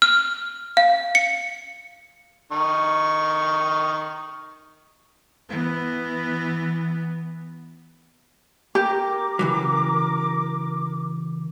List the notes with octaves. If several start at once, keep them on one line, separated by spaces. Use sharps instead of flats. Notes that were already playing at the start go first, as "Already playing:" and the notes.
F6
F5
C#7
D#3 C#6
E3 B3
G4 A#4 D6
C#3 E3 F#3